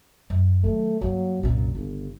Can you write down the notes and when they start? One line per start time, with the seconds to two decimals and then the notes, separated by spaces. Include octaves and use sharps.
0.30 F#2
0.64 D#3 F#3 A3
1.01 G2 F#3 A#3
1.43 C2 F#2 A#2
1.75 G1 C#3